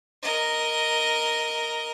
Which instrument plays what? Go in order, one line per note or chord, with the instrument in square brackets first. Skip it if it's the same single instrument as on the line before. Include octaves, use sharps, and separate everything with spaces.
[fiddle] A#4 D#5